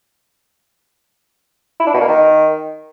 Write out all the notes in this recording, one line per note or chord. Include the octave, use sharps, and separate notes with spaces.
E4
D4
B2
A#3
D#3